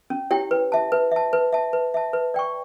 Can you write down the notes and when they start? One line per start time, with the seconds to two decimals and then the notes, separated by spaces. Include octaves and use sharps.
0.10 C#4
0.31 E4 G4 C#5 G5
0.51 B4
0.72 E5 A5
0.92 B4
1.12 E5 A5
1.33 B4
1.53 E5 A5
1.73 B4
1.94 E5 A5
2.13 B4
2.34 D5 G5 C#6